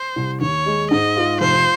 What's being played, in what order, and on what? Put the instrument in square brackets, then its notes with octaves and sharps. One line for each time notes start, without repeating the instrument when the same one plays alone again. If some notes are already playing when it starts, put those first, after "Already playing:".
Already playing: [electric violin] C5
[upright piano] C2
[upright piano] D#2 [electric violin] C#5
[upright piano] G#3
[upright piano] G#2 [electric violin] D#5
[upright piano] F4
[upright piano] F1 [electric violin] C5